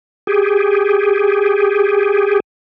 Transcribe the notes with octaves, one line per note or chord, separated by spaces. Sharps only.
G4 G#4